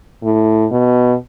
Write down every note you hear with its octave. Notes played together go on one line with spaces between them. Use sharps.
A2
B2